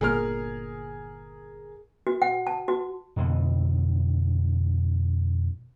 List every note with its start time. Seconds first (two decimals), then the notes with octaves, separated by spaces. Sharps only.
0.01 G1 A#2 G#4 A#4 F6
2.07 F#4
2.22 F#5
2.47 A5
2.68 F#4
3.16 F2 B2 D3 E3